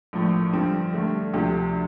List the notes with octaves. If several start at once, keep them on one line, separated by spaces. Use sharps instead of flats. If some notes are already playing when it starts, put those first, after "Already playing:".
A#1 A2 F3
G2 D3 F3 C4
G2 D3 A3
D2 C3 F3